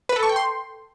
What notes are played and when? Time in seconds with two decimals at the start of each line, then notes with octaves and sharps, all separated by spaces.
0.09 B4
0.16 A4
0.23 C#6
0.29 G5
0.36 C6